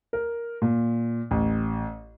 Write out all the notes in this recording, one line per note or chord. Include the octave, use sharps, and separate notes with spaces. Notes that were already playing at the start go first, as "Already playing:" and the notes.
A#4
A#2
A1